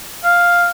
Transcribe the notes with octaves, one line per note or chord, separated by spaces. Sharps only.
F5